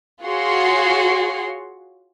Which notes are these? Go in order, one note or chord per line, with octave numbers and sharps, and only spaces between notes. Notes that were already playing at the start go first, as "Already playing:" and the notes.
F4 F#4 G#4 C#5 F#5 C6